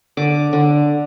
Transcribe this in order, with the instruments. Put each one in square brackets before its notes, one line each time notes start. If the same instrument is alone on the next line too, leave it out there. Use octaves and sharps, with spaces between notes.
[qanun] D3 D6
D3